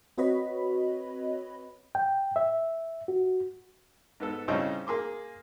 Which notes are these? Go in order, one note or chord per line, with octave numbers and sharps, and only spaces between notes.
C4 F#4 B4 C#5 D#5 B5
G5
E5
F#4
G#2 B3 A4
A2 C#3 G3 C4 C#4 D#4
A#3 G#4 C6 D6